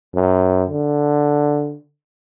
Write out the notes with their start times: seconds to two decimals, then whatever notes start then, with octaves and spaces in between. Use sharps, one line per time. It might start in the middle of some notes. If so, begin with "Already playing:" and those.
0.15 F#2
0.70 D3